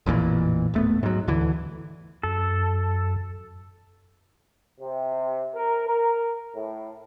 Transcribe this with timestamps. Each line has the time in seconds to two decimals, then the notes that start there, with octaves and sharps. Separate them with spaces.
0.06 A1 F2 A#2 E3
0.74 D#1 A3 B3
1.03 G#2 F#3
1.28 D2 D3 E3
2.23 F#2 A4
4.81 C3
5.55 A#4
5.87 A#4
6.56 A2